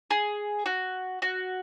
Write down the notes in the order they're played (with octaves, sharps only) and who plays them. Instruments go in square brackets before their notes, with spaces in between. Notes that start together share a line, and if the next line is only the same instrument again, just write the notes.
[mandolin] G#4
F#4
F#4